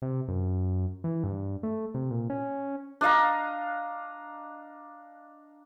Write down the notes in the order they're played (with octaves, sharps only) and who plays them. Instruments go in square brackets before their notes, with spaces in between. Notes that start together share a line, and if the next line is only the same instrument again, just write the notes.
[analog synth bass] C3
F#2
E3
G2
A3
C3
A#2
C#4
[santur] D4 D#5 F5 A#5